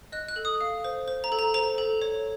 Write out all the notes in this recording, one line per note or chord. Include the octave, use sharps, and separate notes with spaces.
D#5 F#6
F#6
A4
D#6
F5
C5
C5
A#5
A4
A#5
C5 A#5
A4
C#5